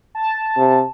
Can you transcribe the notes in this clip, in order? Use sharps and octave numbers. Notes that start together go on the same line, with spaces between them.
A5
C3